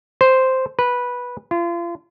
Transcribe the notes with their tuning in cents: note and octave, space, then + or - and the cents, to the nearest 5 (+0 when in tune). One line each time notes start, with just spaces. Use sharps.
C5 -5
B4 -10
F4 -35